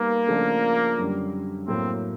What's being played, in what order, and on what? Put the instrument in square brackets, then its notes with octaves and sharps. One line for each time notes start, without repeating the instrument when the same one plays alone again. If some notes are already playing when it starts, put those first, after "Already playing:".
Already playing: [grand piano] G3 B3 D#4 B4 [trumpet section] A#3
[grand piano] C#3 F3 A3 D4 F4
F#2 D3 G3
[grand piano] A2 F#3 A#3 [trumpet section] C4